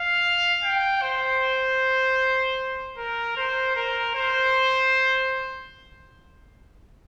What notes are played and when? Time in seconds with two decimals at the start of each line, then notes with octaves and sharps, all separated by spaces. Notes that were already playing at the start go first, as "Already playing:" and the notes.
Already playing: F5
0.64 G5
1.02 C5
2.98 A#4
3.36 C5
3.76 A#4
4.15 C5